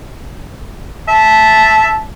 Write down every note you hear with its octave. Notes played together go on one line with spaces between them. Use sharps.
E5 A5